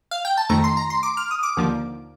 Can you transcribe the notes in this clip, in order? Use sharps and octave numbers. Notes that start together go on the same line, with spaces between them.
F5
G5
A5
F2 D#3 A3 A#5
C6
A#5
C6
D6
F6
D#6
D6
D#2 D3 F3 A#3